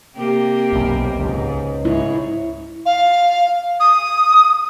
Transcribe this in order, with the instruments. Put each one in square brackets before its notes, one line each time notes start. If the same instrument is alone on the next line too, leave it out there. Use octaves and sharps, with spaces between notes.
[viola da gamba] C3 A#3 G4
[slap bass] B1 F#2
[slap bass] C#2 [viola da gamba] G#2
[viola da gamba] G#2 C#5 [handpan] E4
[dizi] F5
D#6